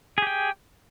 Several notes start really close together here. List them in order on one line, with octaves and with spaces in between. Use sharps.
G#4 G4 G5